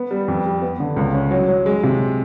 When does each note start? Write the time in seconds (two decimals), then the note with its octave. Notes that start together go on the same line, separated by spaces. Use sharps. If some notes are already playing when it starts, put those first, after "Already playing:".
Already playing: B3
0.11 G3
0.28 F2
0.45 G3
0.62 B3
0.80 D3
0.96 C#2
1.14 C#4
1.31 F#3
1.48 F#3
1.66 G#3
1.83 C3